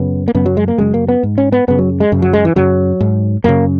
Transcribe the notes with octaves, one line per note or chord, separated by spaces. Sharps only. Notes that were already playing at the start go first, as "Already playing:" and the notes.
Already playing: F#2 C#3 B3
A#3
F#2 C#3 B3
F#3
G#3
A#3
F#2 C#3 G#3
A#3
B3
G#2
C#4
B3
F#2 C#3 B3
F#3
G#3
F#2 C#3
F#3
G#3
E3
F#2 C#3 F#3
G#2
F#2 C#3 A#3